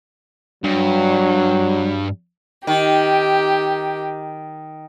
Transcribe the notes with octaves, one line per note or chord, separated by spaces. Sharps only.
G2 F#3
D#3 G4